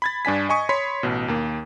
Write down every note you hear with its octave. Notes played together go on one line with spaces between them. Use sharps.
B5 G#6 A6
G2 D4 G#5 B6
D#5 G#5 C#6 D#6
C#5 B5 C6 B6
A1 B2
D#2 A#3